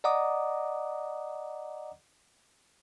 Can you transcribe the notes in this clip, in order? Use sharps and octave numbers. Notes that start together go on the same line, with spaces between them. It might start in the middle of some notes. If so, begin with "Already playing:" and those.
D5 D#5 F#5 A#5 D6 D#6